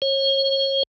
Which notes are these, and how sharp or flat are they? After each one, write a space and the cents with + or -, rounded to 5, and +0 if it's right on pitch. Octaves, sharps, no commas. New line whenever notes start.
C#5 -35